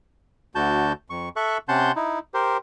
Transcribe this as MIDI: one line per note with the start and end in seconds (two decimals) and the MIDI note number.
0.55 0.93 38
0.55 0.93 50
0.55 0.93 66
0.55 0.93 81
0.55 0.93 91
1.10 1.29 41
1.10 1.29 85
1.36 1.58 69
1.36 1.58 76
1.36 1.58 85
1.36 1.58 90
1.69 1.92 48
1.69 1.92 61
1.69 1.92 78
1.69 1.92 81
1.69 1.92 84
1.69 1.92 91
1.96 2.19 63
1.96 2.19 64
2.34 2.57 67
2.34 2.57 70
2.34 2.57 72